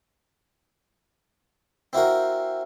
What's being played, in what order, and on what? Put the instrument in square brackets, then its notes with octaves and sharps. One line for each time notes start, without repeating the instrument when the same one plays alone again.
[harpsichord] C4 E4 F#4 A#4